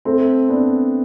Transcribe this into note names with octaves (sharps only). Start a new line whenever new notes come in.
A3 C4
B3 D4